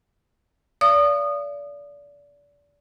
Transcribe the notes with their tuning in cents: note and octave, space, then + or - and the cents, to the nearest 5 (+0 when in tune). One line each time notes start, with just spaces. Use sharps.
D5 -25 F5 -40 D#6 -25